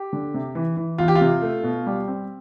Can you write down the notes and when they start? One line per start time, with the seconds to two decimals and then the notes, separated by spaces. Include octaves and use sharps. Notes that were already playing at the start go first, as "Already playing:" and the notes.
Already playing: G4
0.13 D3
0.34 C3
0.55 E3
0.77 E3
0.98 E2 F4
1.08 G4
1.15 F4
1.21 C3
1.42 A3
1.63 B2
1.86 G3
2.08 C4